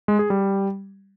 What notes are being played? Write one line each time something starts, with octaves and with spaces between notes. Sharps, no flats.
G#3
G#4
G3